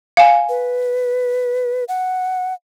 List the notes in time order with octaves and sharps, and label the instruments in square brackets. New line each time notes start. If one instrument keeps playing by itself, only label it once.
[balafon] F5 G#5
[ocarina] B4
F#5